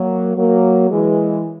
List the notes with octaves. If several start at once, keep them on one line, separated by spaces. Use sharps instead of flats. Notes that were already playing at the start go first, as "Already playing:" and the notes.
Already playing: F#3 A#3
F#3 A#3
E3 G#3